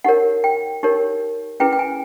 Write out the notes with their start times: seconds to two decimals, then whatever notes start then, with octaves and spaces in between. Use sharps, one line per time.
0.04 D#4 G4 A#4 C#5 F#5
0.44 G5
0.83 D#4 G4 A#4 C#5
1.60 C#4 E4 G#4 B4 G5
1.73 G5
1.79 G#5